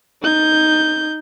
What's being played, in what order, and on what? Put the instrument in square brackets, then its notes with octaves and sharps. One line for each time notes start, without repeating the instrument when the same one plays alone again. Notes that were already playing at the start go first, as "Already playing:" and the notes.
[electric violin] D#4 G6